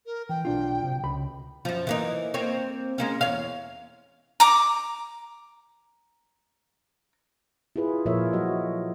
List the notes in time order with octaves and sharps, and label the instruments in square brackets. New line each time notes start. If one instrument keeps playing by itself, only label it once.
[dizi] A#4
[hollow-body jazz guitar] E3 [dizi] G5
[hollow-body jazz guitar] B1 D4 F4
C3
C#2 B5
[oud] F#2 F3
E3 A#3 D#4
A#3 C4 C#5
G#3 A#3 C#4
E2 C#5 F5
[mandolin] A#5 D6
[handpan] E4 F4 G#4 B4
A#2 F3 F4 A#4 C#5 E5
F#3 F#4 D#5